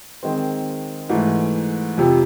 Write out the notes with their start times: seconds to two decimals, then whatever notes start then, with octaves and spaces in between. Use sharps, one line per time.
0.23 D#3 G#3 C4
1.09 G#2 E3 A3
1.98 F2 C3 F3